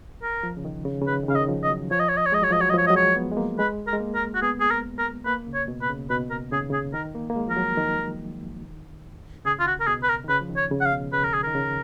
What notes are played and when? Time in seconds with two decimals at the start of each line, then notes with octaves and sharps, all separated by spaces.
0.23 A#4
0.43 F3
0.57 C#3
0.65 D#3
0.85 C#3
1.02 C#3
1.06 D#3 B4
1.23 D#3
1.28 C#3 F5
1.35 D#5
1.42 D#3
1.49 F3
1.63 D#5
1.70 F#3
1.91 F3 C#5
2.00 D#5
2.09 C#5
2.17 D#5
2.25 C#5
2.32 G#3 D#5
2.42 F#3 C#5
2.51 F3 D#5
2.61 F#3 C#5
2.70 D#5
2.74 F3 C#5
2.87 D#5
2.90 F#3
2.95 G#3 C#5
3.16 B3
3.32 G#3
3.37 A#3
3.59 G#3 B4
3.87 A#4
3.93 G#3
4.00 A#3
4.15 A#4
4.35 F#4
4.42 B3 G#4
4.60 G#4
4.71 A#4
4.98 A#4
5.25 A#3 B4
5.47 C#3
5.54 C#5
5.68 B2
5.82 B4
5.89 C#3
6.10 B2 B4
6.30 A#4
6.52 C#3 G#4
6.60 D#3
6.70 C#3 G#4
6.93 D#3 A#4
7.15 A#3
7.30 A#3
7.36 G#3
7.48 F3 A#4
7.56 F#3
7.77 D#3
9.45 C#3 G#4
9.59 F4
9.67 F#4
9.80 A#4
9.87 B2 G#4
10.03 B4
10.09 A#4
10.25 D#3
10.29 C#3 B4
10.41 F3
10.50 D#3
10.57 C#5
10.71 C#3
10.81 F#5
10.86 F5
10.93 B2
11.12 C#3 B4
11.24 A#4
11.33 G#4
11.43 D#3 A#4
11.55 C#3